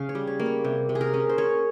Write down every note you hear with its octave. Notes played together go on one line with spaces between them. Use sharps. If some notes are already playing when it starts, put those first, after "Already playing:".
Already playing: C#3 C#4 F5
C#5
G3
C#5
A#3
C#5
C3
C3
G#4
A#4
C#4
C5
C#4 C#5